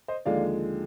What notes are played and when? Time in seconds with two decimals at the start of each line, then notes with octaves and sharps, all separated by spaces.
0.08 C5 D#5
0.25 D#2 D3 F3 G#3 D5 F5